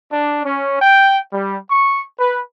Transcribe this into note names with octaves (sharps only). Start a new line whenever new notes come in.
D4
C#4
G5
G3
C#6
B4